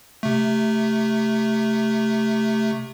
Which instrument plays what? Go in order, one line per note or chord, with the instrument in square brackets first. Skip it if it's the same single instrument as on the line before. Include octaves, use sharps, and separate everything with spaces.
[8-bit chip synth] C3 A3